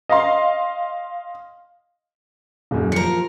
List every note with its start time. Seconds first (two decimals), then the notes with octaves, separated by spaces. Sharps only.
0.09 D#5 F5 C6
2.71 D#1 F#2
2.92 F3 A#4 C#7